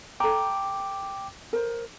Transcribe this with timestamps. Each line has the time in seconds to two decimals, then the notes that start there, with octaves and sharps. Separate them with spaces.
0.20 A4 G5 A#5 D6
1.53 A#4 C5